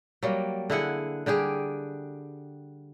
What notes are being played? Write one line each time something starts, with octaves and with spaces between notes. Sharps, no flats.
F#3 G3 A#3
D3 E4 G#4 F#5
D3 G3 G4 G#4